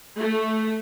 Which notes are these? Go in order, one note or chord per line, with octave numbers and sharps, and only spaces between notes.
A3